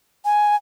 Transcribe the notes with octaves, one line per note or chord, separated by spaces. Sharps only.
G#5